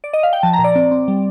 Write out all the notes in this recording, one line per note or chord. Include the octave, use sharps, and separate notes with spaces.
D5
D#5
F5
G5
F3 A5
A#5
A#2
D5
C4
C4
G3